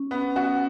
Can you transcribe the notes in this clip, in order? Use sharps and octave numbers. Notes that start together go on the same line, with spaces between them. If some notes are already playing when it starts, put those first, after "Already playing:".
Already playing: C#4
B3
F#4